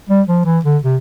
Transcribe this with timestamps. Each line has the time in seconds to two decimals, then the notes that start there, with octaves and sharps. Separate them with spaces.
0.09 G3
0.28 F3
0.46 E3
0.65 D3
0.83 C3